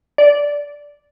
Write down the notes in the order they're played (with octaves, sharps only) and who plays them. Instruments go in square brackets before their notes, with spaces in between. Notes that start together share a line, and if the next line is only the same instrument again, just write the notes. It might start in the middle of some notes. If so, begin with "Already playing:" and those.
[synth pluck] D5